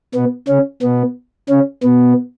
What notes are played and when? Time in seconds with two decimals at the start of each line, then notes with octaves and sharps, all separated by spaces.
0.15 B2 B3
0.48 C#3 C#4
0.83 B2 B3
1.49 C#3 C#4
1.83 B2 B3